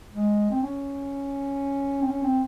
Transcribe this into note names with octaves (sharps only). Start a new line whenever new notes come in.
G#3
C4
C#4
C4
C#4
C4